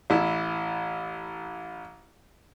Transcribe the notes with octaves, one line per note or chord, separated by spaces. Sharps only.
A1 E4